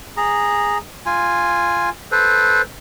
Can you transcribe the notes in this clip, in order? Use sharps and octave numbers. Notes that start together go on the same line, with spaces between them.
G#4 A#5
F4 G#5
A4 B4 C5